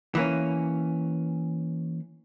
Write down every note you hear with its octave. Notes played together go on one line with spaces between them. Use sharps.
E3 A#3 C#4